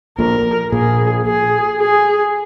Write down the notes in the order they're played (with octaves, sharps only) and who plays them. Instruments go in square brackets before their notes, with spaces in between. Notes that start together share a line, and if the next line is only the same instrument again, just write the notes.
[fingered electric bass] A#1 A#2 [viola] A#4
[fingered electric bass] A#1 A#2 [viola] G#4
[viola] G#4
G#4